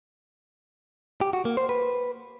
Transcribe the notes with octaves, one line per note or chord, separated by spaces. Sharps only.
G4
F#4
A#3
C5
B4